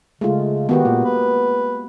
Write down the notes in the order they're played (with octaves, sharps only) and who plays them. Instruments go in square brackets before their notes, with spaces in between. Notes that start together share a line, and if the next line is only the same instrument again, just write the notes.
[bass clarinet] C#3 [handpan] G#3 A3 F4
[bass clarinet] D#3 [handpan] B3 F#4 G4
[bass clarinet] A#2 [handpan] A#3
[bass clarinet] B4